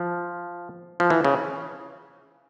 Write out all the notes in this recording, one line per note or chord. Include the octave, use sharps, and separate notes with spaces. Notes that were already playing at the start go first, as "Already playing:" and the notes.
Already playing: F3
F3
E3
C#3